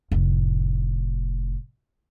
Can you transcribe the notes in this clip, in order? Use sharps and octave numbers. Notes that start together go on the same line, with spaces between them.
F1 A2